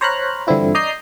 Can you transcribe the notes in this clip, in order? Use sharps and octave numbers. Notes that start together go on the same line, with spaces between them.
C5 C#5 A#5 B5 F6 F#6
G2 D3 E3 C4 E4 F4
D5 D#5 A#5 D#6 G6 C7